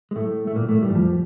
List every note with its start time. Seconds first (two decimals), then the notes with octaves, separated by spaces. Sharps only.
0.11 G#3
0.16 A2 A3
0.47 A3
0.56 A#2 A#3
0.69 A2 A3
0.82 G2 G3
0.90 E3
0.95 F2 F3